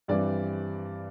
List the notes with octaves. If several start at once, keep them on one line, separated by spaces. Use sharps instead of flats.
G2 E3 G3 C4 D5